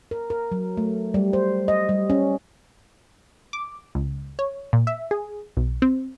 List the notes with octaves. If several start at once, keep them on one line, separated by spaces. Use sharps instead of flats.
A#4
A#4
F#3
A3
G3
C5
D#5
G3
C#4
D6
C#2
C#5
A#2
E5
G#4
B1
C4